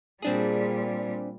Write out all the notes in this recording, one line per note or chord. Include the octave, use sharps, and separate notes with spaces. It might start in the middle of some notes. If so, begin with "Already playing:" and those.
A#2 G3 C4 D4 G#4